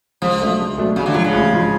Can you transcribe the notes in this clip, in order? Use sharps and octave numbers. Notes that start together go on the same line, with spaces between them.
C#2 F3
B2 F#3 A3 D4
C#2
B2 F#3 A3 D4
A1 C#3
D3
G#2 F3 F#3
C#3
A1
G#2 F3